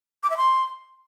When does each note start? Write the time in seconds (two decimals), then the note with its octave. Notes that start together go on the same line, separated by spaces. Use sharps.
0.23 D6
0.30 E5
0.37 C6